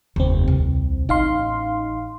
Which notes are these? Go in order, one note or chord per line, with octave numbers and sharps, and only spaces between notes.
F1 D#2 C4
C2
A1 D#4 F5 C6